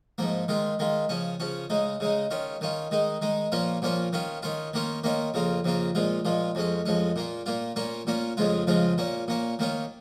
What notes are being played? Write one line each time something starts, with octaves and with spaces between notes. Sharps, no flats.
G#2 F3 A#3
D#3 G#3 F4
D#3 G#3 F4
C#3 F3 C#4
C#3 F3 C#4
C#3 G#3 D#4
C#3 G#3 D#4
D#3 C#4 F4
D#3 C#4 F4
D#3 G#3 D#4
D#3 G#3 D#4
A#2 F3 A#3 C#4 F4
A#2 F3 A#3 C#4 F4
D#3 C#4 F4
D#3 C#4 F4
D#3 A#3 C#4 F4
D#3 A#3 C#4 F4
F2 C#3 A#3 F4
F2 C#3 A#3 F4
A#2 F3 G#3 F4
A#2 F3 G#3 F4
F2 F3 G#3 C#4
F2 F3 G#3 C#4
A#2 A#3 F4
A#2 A#3 F4
A#2 A#3 C#4 F4
A#2 A#3 C#4 F4
F2 C#3 F3 G#3 F4
F2 C#3 F3 G#3 F4
A#2 A#3 C#4
A#2 A#3 C#4
D#3 A#3 C#4 F4